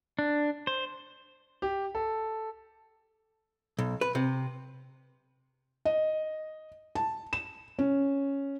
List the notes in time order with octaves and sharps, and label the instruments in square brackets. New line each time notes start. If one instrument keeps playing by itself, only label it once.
[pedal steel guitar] D4
C5
[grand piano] G4
A4
[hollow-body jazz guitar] B1
B4
C3
[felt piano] D#5
A5
E7
C#4